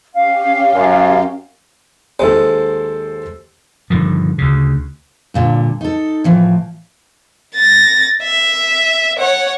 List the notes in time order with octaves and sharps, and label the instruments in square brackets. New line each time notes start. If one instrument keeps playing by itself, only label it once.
[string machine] C#4 G4 [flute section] F5
[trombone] F#2
[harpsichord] D#2 G#3 [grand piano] A4 C5
[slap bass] G2 D3 D#3 F3
D2 C#3
[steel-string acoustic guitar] G2 A#2 D3
D#4 A4
A2 E3 F3
[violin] A6 A#6
E5
C#5 F#5